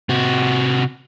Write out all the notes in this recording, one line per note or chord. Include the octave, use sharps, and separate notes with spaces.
C3 F#4